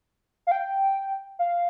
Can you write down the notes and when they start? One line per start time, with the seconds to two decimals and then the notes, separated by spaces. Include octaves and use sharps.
0.47 F5
0.51 G5
1.39 F5